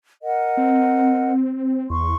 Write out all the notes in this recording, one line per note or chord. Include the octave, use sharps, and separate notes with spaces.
A#4 D#5 F#5
C4
E2 C6 C#6